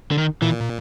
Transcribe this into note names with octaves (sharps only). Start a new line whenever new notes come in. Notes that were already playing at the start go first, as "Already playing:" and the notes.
D3
D#3
A#2 E3